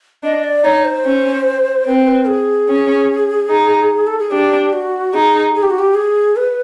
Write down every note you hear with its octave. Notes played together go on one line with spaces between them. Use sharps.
D4 D#5
D5
D#4 C#5
C5
C#4
C4 B4
C5
B4
G#4
C#4
D#4
A4
G#4
D4 G4
F#4
D#4 G#4
G#4
G4
F#4
G4
G#4
B4